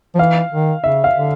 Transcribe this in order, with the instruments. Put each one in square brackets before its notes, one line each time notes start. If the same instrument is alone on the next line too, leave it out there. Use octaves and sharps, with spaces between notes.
[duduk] F3
[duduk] E3 [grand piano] F5
[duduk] D#3
[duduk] C#3 [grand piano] E5
[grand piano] F5
[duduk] D3